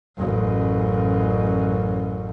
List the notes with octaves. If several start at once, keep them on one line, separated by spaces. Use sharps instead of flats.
A1 F#2